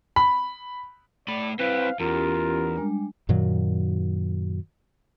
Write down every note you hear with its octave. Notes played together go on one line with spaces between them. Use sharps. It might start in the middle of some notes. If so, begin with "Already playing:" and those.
B5
A3 D5 B5
C4 E4 B4 C5 F5
E2 C#4 F4 G4 A#4
G3 G#3 D4
F#2 A#2 D#3 F#3